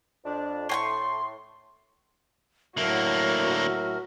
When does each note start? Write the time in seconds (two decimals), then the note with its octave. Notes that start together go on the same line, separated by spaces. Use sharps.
0.25 F2 D4
0.69 A2 A3 G5 C6 C#6
2.77 A2 D3 F#3 A#3 F#4 A#4 E5